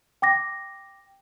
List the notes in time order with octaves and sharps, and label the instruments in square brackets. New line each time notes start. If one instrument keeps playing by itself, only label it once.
[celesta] G5 D6 A#6